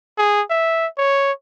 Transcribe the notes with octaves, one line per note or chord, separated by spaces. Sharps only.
G#4
E5
C#5